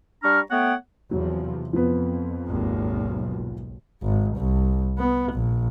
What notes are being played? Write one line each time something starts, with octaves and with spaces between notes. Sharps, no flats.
G3 D4 A#5 C#6 F6
A3 B3 C#5 F#5 G5
E2 C3 F3 F#3
F2 F3 B3
G#1 D#2
B1
G#1
C2
B3
A#1